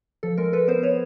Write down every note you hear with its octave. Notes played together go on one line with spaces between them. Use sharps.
F3 A4
G#3 A#4
G#3 A4 B4
B3 A#4 C5
B3 B4 C#5